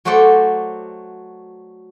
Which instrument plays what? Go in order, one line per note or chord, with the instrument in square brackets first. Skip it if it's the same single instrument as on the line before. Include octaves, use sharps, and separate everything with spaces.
[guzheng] F#3 A3 F#4 C5 D5 G5